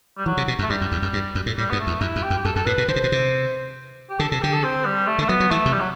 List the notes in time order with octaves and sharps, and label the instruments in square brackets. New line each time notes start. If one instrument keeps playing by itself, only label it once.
[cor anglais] G3
[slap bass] E3 [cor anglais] F#3
[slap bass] C3
B2
F#2
[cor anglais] A3
[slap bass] G2 [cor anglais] G3
[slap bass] F#2
E2
F#2
G2
F#2
A2
[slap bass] A2 [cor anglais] G3
[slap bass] G2 [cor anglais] B3
[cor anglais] A3
[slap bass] E2
[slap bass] F#2 [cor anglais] E4
[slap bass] F#2
[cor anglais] G4
[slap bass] F#2
[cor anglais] G4
[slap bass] F#2 [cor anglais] A4
[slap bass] F#2 [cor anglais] A4
[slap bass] A2 [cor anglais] B4
[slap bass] B2
[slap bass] D3 [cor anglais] C5
[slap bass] C3
B2
C3
[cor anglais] G4
[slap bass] D3 [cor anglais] A4
[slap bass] C3 [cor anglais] A4
[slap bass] D3 [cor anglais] G4
[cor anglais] A4
C4
G3
A3
[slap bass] D3
[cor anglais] A3
[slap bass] F#3 [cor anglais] B3
[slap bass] F#3
[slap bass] E3 [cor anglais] A3
[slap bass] C3
[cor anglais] G3
F#3